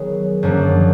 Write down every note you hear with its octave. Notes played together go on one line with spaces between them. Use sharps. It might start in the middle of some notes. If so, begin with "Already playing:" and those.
Already playing: D#3 F#3 B3 G#4
F#2 D3 F3 A#3